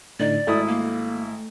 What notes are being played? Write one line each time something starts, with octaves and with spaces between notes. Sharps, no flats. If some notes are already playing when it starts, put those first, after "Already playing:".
A2 D3 D#4 D5
G#1 A3 E4 D#6
A#3